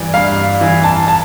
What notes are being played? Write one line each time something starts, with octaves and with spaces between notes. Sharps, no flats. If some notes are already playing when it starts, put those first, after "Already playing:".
Already playing: G2 E3 D5
G2 F5
E3
A5
A5